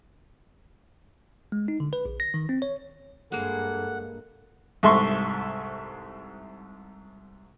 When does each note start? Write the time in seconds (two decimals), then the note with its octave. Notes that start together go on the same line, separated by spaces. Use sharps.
1.52 G#3
1.68 D#4
1.80 D3
1.93 B4
2.05 A#1
2.20 A#6
2.34 D#3
2.49 C4
2.62 C#5
3.32 G2 G#3 A#3 A4 F#5
4.83 C2 G#2 A4 E5 C6 C#6